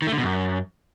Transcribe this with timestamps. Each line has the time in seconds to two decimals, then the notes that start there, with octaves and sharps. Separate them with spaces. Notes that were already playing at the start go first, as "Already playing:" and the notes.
0.02 D#3
0.07 A3
0.12 D3
0.18 B2
0.23 F#2